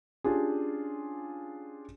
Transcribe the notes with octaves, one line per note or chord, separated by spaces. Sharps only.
C#4 D4 F4 G4 G#4